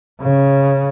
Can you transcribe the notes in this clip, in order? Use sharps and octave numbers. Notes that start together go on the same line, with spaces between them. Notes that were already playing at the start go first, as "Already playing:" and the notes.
C#3